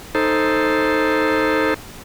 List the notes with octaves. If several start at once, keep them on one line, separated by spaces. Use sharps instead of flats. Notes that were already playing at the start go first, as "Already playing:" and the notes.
D#4 A4 C5